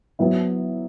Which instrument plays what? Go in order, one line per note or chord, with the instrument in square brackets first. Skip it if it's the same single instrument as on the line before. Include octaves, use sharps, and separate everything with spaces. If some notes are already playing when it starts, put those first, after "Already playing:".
[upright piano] F#3 B3 E4